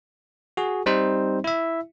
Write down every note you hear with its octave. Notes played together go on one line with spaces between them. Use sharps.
F#4 G#4
G3 C4 D#4 C5
E4 E5